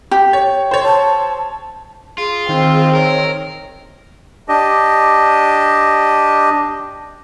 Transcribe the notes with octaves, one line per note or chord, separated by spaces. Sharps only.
G4
C#5
C5 C#5
A5
F4 G#4
D#3 C4
A#4 C#5
D4 G4 D#5